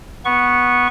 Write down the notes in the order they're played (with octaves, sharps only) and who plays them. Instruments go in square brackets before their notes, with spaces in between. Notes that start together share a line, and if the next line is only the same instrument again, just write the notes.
[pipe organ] B3 C#6